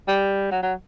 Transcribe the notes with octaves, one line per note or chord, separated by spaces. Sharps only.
G3
F#3
F#3